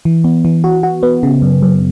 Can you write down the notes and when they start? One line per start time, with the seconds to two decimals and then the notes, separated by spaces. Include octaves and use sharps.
0.05 E3
0.24 B3
0.45 E3
0.64 F#4
0.83 F#4
1.03 B3
1.23 C#3
1.42 F#2
1.62 F#2